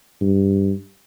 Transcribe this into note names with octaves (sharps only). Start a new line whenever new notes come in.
G2